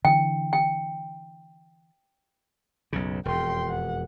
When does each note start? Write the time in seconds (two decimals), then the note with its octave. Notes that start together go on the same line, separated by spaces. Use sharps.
0.05 D3 E3 G5
0.53 G5
2.93 B1 F#2 C#3
3.25 E1 F2 G5 C6
3.68 F#5